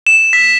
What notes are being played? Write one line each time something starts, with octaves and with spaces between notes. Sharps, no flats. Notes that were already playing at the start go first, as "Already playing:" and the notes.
E7
B6